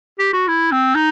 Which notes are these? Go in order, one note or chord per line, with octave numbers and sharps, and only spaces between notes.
G4
F#4
E4
C4
D#4